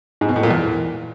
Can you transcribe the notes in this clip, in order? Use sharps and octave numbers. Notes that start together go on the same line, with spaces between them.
G#2
B2
A2
A#2
E2